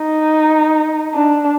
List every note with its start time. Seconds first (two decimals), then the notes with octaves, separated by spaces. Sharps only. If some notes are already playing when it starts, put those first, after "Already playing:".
Already playing: D#4
1.14 D4